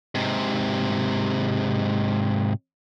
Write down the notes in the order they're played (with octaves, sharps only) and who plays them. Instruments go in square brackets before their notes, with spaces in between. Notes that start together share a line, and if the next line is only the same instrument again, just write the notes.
[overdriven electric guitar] G#2 C3